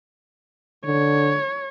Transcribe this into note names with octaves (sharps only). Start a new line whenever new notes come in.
D3 C#5